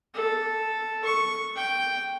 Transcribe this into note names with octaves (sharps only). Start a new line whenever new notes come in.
A4
C#6
G5